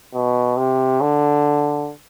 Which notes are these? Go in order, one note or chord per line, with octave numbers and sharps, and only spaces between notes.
B2
C3
D3